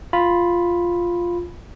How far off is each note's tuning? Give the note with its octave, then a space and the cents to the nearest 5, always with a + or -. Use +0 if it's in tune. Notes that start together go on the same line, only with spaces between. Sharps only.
F4 +0 B5 +0